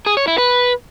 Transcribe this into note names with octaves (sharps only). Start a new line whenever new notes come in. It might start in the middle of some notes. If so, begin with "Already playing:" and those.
G#4
C#5
E4
B4